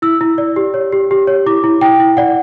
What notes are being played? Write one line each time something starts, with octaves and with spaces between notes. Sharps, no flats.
E4 E6
E4
D5
G4
C#5
G4
G4
C#5
E4 D6
E4
E4 G5
E4
D5 F#5